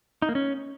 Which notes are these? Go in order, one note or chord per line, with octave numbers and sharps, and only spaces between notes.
D#4
A#3
C#4